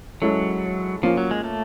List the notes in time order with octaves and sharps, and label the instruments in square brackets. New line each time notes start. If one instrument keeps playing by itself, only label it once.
[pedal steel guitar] F#3 [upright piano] G#3 C#4 E4 A4
[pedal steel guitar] F3 [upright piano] A#3 C#4 F4
[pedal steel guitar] F#3
G#3
A3